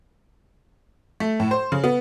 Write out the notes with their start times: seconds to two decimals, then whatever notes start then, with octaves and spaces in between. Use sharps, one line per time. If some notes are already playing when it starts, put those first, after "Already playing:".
1.20 A3
1.40 A2
1.51 C5
1.72 C#3
1.84 B3